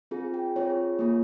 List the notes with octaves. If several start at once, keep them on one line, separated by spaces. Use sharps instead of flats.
C4 F4 G#4
G5
C4 F4 G#4 C#5
A#3 F4 G#4